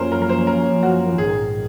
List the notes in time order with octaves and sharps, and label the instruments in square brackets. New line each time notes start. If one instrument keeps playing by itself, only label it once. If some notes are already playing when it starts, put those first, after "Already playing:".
Already playing: [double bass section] F#2 F3 A#3 C#4 [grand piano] A#4 C5
[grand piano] A#4
A#4
C5
A#4
F#4
[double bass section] A#1 G#2 D#3 [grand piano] G#4